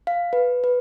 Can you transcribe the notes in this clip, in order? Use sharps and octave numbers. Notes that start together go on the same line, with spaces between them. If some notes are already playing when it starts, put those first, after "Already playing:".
F5
B4
B4